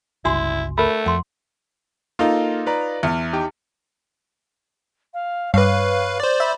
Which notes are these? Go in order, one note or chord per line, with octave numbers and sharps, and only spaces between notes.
G1 C#2 E4 F#4 G#5 C6
A3 A#4 B5
F2 F#5 C6
A#3 D#4 F4 A4 F5
B4 D5 A#5
E2 F6 C#7
D#4 G4 G5
F5
G2 B4 C#5 F5
C5 D5
E5 B5